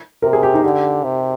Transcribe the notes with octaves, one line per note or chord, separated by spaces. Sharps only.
C3 A#4
G#4
G4
D#4
D3 G4
C3